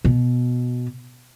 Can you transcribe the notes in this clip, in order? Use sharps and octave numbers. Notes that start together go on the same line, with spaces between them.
B2